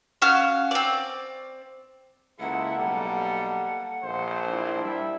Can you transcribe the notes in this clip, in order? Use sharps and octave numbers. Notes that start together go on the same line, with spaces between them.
C#4 F#4 F5 F6
C4 D5
C#2 A#3 E4 A4 F#5
B1 G3
A#1 C5
D4 E4
G3 E5